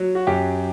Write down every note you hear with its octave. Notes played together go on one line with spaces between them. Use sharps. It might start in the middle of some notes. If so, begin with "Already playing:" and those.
Already playing: F#3
F#4
F#2 G4